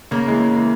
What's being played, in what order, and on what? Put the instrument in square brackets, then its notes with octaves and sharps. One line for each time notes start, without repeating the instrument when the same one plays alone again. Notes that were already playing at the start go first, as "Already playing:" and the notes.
[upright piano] C#3 [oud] A#3
[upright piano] E3 G#3
C#3
E3 G#3